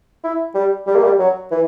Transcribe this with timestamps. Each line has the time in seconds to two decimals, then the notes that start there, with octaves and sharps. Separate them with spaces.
0.24 E4
0.55 G3
0.87 G3
0.96 A#3
1.04 G3
1.19 F#3
1.51 E3